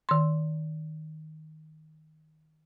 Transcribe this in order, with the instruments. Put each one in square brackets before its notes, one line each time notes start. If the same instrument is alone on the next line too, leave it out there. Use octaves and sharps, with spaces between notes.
[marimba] D#3 C6